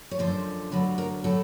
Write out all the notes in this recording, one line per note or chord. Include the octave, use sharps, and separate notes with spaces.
C#5
F#2 D3 F3 C5
D2 D3 F#3 B4
A#4
A2 F#3 A4